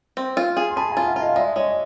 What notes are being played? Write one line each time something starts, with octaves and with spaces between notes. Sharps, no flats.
C4
F4
G#4
C6
G#4 A5 B5
G#5 A#5
F4
E5 F#5
F4
D#5 F5
G#3 D5 E5
G#3 C#5 D#5